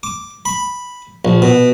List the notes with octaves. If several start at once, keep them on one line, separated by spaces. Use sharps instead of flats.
D6
B5
A#1
B2